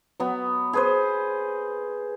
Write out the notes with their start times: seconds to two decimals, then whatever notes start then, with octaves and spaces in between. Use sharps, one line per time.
0.20 F#3 B3
0.73 G#4 B4 C5